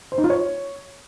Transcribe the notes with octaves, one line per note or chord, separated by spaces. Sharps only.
C5
D#4
F4
C#5